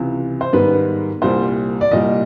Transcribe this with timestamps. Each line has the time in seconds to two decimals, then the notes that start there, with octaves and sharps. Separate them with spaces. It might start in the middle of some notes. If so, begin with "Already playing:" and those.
Already playing: C#2 C3 E3
0.41 C5
0.53 G#2 D#3 G3 B3 B4
1.22 C2 A#2 G3 C5
1.81 D5
1.91 C2 A#2 G3 D#5